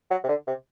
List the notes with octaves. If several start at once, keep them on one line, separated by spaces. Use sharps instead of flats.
F#3
C3
D3
C3